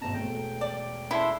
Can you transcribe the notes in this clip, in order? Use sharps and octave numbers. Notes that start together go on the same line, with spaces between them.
G#1 B2 A5 A#5
E1 A3 G5
D5
C#3 D4 E4 E5 C6